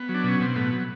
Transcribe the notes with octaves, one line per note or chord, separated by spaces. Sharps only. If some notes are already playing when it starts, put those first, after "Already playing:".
Already playing: B3
F#3
D4
B2 C#4
B2 C4
A2 B3
F#3